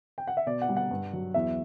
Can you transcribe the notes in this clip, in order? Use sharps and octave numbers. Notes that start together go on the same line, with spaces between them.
G5
F#5
E5
B2 D5
F#5
G3
F#5
G2
F#3
E2 E5